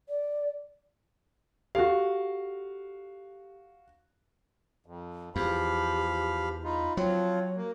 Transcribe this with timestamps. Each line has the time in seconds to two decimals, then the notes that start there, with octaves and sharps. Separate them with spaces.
0.09 D5
1.75 F#4 G4 A4 F5
4.86 F2
5.36 E2 F3 G4 F5 B5
6.64 D#4 F4 B5
6.97 F3 F#3 C4 F4 C#5
7.56 A#3